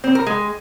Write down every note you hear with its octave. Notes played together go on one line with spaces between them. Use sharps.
C4
A#4
G#3